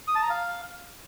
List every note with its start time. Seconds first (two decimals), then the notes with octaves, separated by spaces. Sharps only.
0.08 D#6
0.15 A5
0.23 A#5
0.30 F5